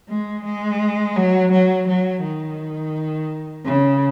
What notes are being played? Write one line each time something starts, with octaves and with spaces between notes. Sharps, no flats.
G#3
G#3
F#3
F#3
F#3
D#3
C#3